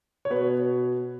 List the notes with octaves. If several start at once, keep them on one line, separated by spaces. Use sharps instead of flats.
C#5
B2 B4